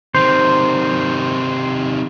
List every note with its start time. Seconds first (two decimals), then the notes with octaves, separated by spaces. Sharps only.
0.15 C3 D#3 C5